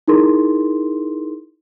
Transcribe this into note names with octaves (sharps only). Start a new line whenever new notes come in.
D#4 E4 G#4 A#4 C6